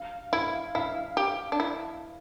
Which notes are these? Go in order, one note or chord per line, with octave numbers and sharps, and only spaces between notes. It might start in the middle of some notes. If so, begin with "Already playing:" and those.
Already playing: F5
E4 F5
E4 F5
G4
D4
E4